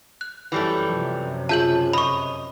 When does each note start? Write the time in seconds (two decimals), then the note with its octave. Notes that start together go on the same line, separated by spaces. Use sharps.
0.21 F#6
0.52 F#2 E3 G3 A3
0.89 F#2 C3 F3
1.49 C#3 F4 G#4 E5 A5 G6 F#7
1.93 F2 D#5 B5 C#6